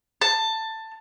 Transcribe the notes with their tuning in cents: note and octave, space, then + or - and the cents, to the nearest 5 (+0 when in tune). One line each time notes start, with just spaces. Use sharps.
A5 +15